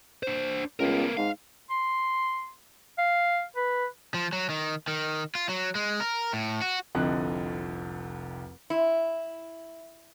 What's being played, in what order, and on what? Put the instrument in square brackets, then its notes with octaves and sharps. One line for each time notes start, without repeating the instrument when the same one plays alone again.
[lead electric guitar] D4 C5
[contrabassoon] C#2 [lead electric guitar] B3 A#4
[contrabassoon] G#2 [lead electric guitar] F5
[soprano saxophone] C6
F5
B4
[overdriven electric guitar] F3
F#3
D#3
D#3
F4
F#3
G#3
A#4
A2
F#4
[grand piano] F1 C2 F2 D3 D#5 F#6
[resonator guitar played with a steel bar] E4